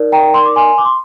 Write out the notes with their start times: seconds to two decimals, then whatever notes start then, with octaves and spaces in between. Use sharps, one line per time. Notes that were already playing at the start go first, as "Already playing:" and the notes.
Already playing: D#4 A#4 D5
0.12 G5 A#5
0.34 C6
0.46 D6
0.56 G#5 C6
0.78 D6
0.85 C6